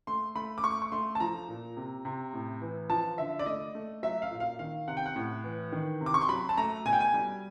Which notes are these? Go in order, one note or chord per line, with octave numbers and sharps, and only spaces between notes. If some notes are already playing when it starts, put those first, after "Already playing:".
A3 C6
A3 B5
D6
A3 C#6
C#6
A3 C6
A5
F3 A#5
A#2
C3
C3
A2
E3
F3 A5
D3 E5
D5
A3 D#5
A3
F#3 E5
F5
A#2
F5
D#3 F5
C3 F#5
G5
F#5
A2
E3
D#3
C3
D6
C#6
C6
F#3 B5
A5
A3 A#5
B2 G#5
G5
G#5
G3